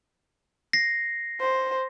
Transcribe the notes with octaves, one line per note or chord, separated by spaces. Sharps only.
A#6 C7
C5